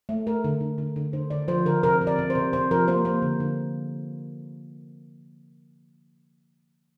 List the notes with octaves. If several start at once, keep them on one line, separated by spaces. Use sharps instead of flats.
A3
A3 A#4
D3
D3
D3
D3
D3 C5
D3 D5
F3 C5
D3 A#4
C3 A#4
C3
D5
C3
C5
C3
C3 C5
F3 A#4
A#3 C5
A#3 C5
D3
D3